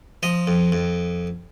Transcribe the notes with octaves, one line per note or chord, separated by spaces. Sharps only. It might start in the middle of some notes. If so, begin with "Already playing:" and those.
F3 D#5
F2
F2